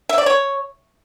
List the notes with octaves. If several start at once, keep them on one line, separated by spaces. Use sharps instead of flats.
E5
D5
C#5